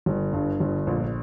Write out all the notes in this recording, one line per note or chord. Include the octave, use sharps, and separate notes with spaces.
G1
G2
G1
A#1